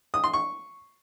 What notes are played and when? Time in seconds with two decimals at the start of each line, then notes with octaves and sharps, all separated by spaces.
0.14 D#6
0.24 C6
0.33 C#6